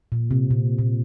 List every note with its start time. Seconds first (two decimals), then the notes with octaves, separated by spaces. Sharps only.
0.12 A#2
0.31 C3
0.51 A#2
0.78 A#2